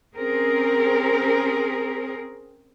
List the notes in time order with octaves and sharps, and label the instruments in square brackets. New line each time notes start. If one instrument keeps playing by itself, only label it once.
[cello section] C4 C#4 G#4 A#4